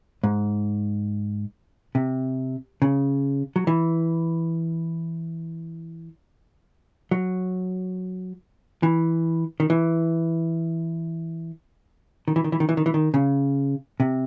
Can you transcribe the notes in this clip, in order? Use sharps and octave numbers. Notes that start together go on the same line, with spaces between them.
G#2
C3
C#3
F#3
E3
F#3
E3
D#3
E3
D#3
E3
D#3
E3
D#3
E3
D#3
E3
D#3
C#3
C3